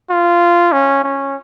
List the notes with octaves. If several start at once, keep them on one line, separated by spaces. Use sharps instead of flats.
F4
C#4
C#4